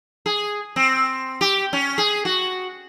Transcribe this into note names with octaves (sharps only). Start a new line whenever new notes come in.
G#4
C4
G4
C#4
G#4
F#4